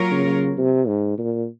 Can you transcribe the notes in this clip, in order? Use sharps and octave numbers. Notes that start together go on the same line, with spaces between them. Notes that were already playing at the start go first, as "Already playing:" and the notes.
Already playing: F#3 A#3 F4 A#4 C#5
C#3
C3
G#2
A#2